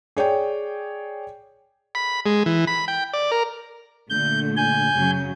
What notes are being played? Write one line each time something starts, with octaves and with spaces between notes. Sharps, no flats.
G#4 C#5 D5 G5
B5
G#3
E3
B5
G5
D5
A#4
A#2 D3 A3 G6
G#5 G6
F#2 C#3 F#3